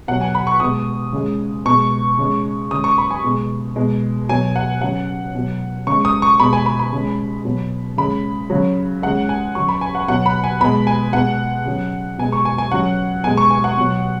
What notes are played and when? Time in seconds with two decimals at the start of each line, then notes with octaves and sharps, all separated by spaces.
0.08 B2 F#3 F#5
0.21 G#5
0.35 B5
0.47 C#6
0.60 B2 G#3 D#6
1.13 C#3 G#3
1.66 B2 G#3 C#6
2.19 C#3 G#3
2.71 C#3 G#3 D#6
2.84 C#6
2.98 B5
3.11 G#5
3.24 B2 G#3
3.76 B2 G#3
4.29 B2 F#3 G#5
4.56 F#5
4.81 C#3 F#3 F#5
5.35 B2 F#3
5.87 C#3 G#3 C#6
6.05 D#6
6.22 C#6
6.40 B2 G#3 B5
6.53 G#5
6.66 B5
6.79 B5
6.93 C#3 G#3
7.45 B2 F#3
7.97 C#3 G#3 B5
8.50 C#3 F#3
9.02 C#3 G#3 F#5
9.29 G#5
9.55 C#3 F#3 C#6
9.69 B5
9.81 G#5
9.95 F#5
10.08 B2 F#3 F#5
10.26 B5
10.44 G#5
10.61 B2 G#3 B5
10.87 G#5
11.13 B2 G#3 F#5
11.66 C#3 F#3
12.18 B2 G#3 G#5
12.32 C#6
12.45 G#5
12.58 G#5
12.71 C#3 F#3 F#5
13.24 B2 G#3 G#5
13.37 C#6
13.51 G#5
13.64 F#5
13.77 B2 F#3